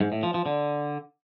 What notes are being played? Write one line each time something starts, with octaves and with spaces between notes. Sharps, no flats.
G#2
A2
F3
F3
D3